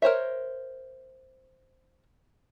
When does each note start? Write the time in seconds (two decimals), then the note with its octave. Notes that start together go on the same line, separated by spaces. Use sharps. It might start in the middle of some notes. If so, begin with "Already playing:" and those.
0.02 A#4 C5 C#5 E5